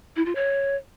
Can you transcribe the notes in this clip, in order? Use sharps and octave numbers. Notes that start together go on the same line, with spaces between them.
E4
F4
C#5